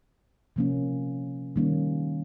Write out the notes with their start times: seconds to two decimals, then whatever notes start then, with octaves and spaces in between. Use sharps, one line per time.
0.56 C3 F3 A#3 C#4
1.56 D#3 G3 A#3 C#4